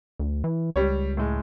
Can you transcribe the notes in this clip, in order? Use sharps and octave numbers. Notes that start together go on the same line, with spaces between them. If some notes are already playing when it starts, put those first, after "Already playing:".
D2
E3
C#2 G3 C#5
A2 G#3